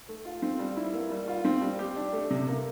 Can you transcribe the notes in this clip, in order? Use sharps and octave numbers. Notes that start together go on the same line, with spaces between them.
A3
F4
C4
G3
E4
A#3
G3
F4
C4
G3
G4
D4
A3
C3
A#3